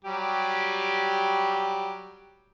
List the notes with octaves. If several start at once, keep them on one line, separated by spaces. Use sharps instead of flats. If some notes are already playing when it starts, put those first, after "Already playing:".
F#3 G3 G4